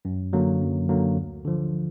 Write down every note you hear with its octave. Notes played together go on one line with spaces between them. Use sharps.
F#2
D3 F#3 A#3
F#2
D3 F#3 A#3
D2
D3 F3